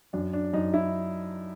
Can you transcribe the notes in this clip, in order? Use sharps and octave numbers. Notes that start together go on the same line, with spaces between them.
F#2 D4
D4
F#2 D#4
E4